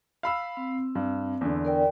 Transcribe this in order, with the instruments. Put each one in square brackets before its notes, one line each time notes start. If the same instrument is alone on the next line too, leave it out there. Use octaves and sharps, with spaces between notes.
[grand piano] F5 B5 E6
[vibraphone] C4
[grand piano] G2
E2 D3
[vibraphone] A#4 D5 G5